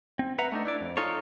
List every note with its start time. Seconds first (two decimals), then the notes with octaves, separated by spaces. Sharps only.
0.19 C4
0.39 B4 E5 F#5 A#5
0.52 A3 D4 D#4
0.65 D4 E4 D5
0.81 F2
0.97 D#4 F4 A4 C#5